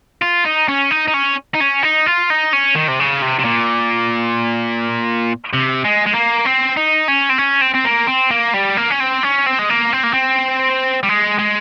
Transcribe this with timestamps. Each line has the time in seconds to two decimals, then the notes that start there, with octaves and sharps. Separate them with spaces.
0.22 F4
0.45 D#4
0.68 C#4
0.91 D#4
1.08 D#4
1.14 C#4
1.54 D#4
1.61 C#4
1.83 D#4
2.06 F4
2.30 D#4
2.53 C#4
2.76 D#3
2.88 C3
3.00 C#3
3.22 C3
3.39 C3
3.45 A#2
5.53 C3
5.85 G#3
6.06 G#3
6.15 A#3
6.46 C4
6.77 D#4
7.08 C#4
7.29 C4
7.38 C#4
7.61 C4
7.74 C4
7.85 A#3
8.07 C4
8.31 A#3
8.54 G3
8.77 A#3
8.90 C#4
9.00 C4
9.23 C#4
9.46 C4
9.59 G#3
9.69 A#3
9.93 C4
10.03 A#3
10.14 C4
11.03 G3
11.09 G#3
11.39 G#3